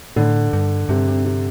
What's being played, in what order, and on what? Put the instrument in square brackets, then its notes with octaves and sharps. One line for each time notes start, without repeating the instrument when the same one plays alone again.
[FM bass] A2 [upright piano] D3
[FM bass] G2
[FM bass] G2 [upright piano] C3
[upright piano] C3
C3